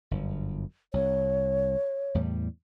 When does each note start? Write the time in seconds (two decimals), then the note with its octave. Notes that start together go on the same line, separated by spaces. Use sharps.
0.11 G1 F#2
0.94 C2 C#5
2.15 E2 A2 G3